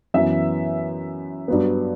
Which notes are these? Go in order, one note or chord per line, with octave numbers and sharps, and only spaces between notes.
F#2 E3 B3 E5
G2 F#3 B3